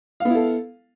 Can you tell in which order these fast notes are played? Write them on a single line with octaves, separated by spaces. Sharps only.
F5 B3 E4 A4